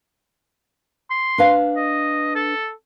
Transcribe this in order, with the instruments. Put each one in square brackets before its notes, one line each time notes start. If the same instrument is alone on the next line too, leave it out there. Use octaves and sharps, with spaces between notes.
[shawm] C6
[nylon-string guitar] D4 B4 F5
[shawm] D#5
A4